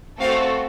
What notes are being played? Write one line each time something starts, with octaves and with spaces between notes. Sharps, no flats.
A3 C4 F#4 A4 F5